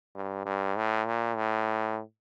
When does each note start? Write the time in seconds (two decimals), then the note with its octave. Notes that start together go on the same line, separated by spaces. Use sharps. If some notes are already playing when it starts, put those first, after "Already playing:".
0.15 G2
0.46 G2
0.76 A2
1.06 A#2
1.36 A2